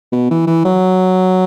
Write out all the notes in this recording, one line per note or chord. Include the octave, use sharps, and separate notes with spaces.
B2
E3
E3
F#3